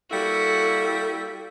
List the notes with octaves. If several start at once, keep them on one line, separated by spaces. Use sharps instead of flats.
G3 A#3 E4 F#4 A4